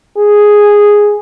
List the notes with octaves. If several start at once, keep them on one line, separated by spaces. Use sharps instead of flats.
G#4